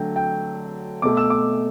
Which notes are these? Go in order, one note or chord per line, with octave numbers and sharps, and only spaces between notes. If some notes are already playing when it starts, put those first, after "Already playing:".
Already playing: D3 F#3 A3 G5
G5
B2 A3 D6
E6
D6